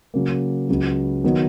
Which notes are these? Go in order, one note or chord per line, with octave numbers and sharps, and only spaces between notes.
C#3 F#3 A#3
C#2 C#3 F#3
D#3 F#3 B3